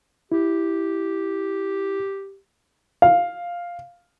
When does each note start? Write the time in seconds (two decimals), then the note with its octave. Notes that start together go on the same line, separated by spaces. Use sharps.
0.32 E4 G4
3.02 F5